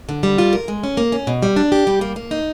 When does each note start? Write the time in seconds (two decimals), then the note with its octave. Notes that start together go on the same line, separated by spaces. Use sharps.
0.09 D3
0.23 G3
0.38 F4
0.53 A#4
0.68 G#3
0.84 C#4
0.97 A#3
1.12 C#4
1.27 B2
1.43 G3
1.56 D4
1.72 G4
1.87 G3
2.01 A#3
2.16 A#3
2.31 D#4